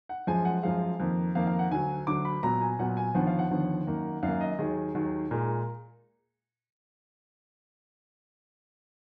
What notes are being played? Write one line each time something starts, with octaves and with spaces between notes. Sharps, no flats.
F#5
F#2 F3 G#3 G#5
F#5
F#2 F3 G#3 F5
F2 D#3 A#3
F2 D#3 A#3 F5
F5
F#5
D2 D3 F#3 G#5
D2 D3 F#3 D6
B5
A#2 F#3 B3 A#5
G#5
A#2 F#3 B3 F#5
G#5
D#2 D3 F3 B3 F#5
F5
F#5
D#2 D3 F3 B3
F#2 D#3 A#3
F#2 D#3 A#3 F5
D#5
D#2 D#3 F#3 G#4
D#2 D#3 F#3
A#2 G#3 A#4